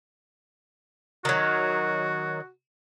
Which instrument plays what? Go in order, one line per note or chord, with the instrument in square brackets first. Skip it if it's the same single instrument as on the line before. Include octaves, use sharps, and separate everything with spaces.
[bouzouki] D#3 F#3 [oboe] F#4